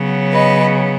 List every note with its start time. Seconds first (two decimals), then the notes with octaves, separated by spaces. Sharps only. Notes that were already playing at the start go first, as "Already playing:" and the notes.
Already playing: C#3 F#3 B3
0.31 B4 D#5